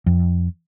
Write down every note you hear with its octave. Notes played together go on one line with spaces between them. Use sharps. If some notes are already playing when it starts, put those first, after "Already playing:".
F2